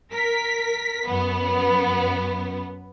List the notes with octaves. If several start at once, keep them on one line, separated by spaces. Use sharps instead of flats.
A#4 B6
F#2 B3